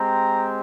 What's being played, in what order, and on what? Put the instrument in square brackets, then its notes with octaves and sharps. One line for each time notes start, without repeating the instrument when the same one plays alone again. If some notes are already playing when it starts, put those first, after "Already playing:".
Already playing: [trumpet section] G#3 C4 G4 A#5